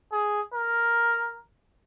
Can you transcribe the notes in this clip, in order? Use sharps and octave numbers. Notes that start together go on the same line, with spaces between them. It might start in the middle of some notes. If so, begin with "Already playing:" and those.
G#4
A#4